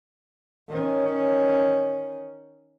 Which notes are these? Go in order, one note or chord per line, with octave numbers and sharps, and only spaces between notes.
D#3 C#4